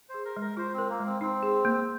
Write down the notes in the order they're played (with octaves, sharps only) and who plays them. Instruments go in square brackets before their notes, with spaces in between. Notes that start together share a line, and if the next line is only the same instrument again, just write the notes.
[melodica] C5
[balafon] G#4
[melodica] A#4
[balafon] G#3 [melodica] A#4
[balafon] F4 [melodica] C5
[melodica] C4 [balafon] A#4
[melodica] A#3
[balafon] G#3
[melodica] C4
[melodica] C4 [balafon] D#4
[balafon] G#4
A#3